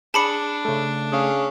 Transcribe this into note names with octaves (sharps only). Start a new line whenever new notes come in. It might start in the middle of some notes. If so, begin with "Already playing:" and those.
D4 G#4 A5 B5 D6 C#7
C#3 A3
C#4 G#4 F5